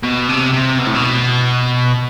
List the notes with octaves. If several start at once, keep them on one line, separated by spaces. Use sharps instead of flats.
B2
C3
C3
B2
A2
B2